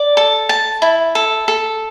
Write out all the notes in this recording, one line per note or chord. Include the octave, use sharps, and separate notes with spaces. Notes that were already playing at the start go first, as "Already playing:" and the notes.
Already playing: D5
A4
A5
E4
A4
A4